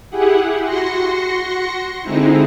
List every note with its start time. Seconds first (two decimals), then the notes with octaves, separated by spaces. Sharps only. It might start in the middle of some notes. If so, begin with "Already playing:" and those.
0.10 E4 G4 G#4 F#5
0.64 F#4 C6 A#6 C#7
2.02 D3 G#3 C4 D#4 E4